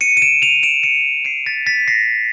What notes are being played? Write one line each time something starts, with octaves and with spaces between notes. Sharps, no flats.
C#7 D#7
D#7
D7 E7
D#7 F7
D7 E7
C#7 D#7
C7 D7
A6 B6
A6 B6
A#6 C7